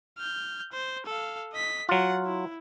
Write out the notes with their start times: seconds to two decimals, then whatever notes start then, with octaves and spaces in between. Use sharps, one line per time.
0.18 F6 G6
0.72 C5
1.06 A4 F5
1.52 D#5 B6
1.89 F#3 F4 F#5
2.25 E4